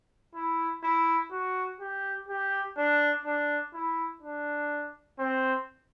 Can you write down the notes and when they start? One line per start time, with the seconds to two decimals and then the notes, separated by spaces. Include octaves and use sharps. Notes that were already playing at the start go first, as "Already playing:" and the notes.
0.35 E4
0.83 E4
1.31 F#4
1.80 G4
2.29 G4
2.77 D4
3.25 D4
3.74 E4
4.22 D4
5.19 C4